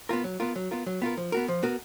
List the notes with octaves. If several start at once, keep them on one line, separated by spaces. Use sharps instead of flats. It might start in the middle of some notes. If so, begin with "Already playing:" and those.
B3 F4 A#4
F#3
B3 F4 A#4
F#3
B3 F4 A#4
F#3
B3 F4 A#4
F3
B3 F#4 A#4
F3
B3 F#4 A#4